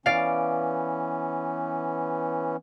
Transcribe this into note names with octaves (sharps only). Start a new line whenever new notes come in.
E3 B3 C#4 D5 F5